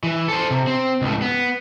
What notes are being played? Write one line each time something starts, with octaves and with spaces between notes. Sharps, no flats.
E3
A4 C5
C3
C4
C#2 A2
B3